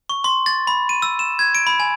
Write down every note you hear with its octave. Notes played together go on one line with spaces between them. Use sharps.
C#6
C6
A6
B5
D#7
E6
E7
G#6
D7
B5
G#5